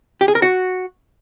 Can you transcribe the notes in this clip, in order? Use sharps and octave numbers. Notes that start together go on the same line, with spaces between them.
G4
G#4
A#4
F#4